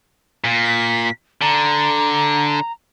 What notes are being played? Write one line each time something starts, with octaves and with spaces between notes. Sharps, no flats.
A#2
B6
D3 A#5